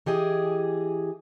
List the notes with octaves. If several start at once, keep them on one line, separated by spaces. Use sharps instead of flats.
E3 G4 G#4 D#5